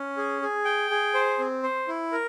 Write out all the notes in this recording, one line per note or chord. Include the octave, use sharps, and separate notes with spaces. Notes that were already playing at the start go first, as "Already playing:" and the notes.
Already playing: C#4
G#4
G#4
G5
G#4
C5
C4
C5
E4
A#4